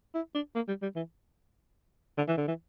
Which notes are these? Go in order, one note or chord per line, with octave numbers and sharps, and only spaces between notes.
E4
D4
A#3
G3
G3
E3
D3
E3
D3
E3